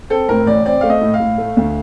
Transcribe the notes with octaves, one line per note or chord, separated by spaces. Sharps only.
C4 A4
A2 A#4
A1 D5
C4 D5
A3 F5
D#5
A2
F5
A2
A3
D2